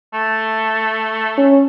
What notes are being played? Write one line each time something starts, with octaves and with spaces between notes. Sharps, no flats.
A3
C#4